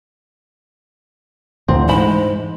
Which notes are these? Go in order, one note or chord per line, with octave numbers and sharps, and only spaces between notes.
D2 A#2 D3 E3 C4
G#2 G#3 C5 B5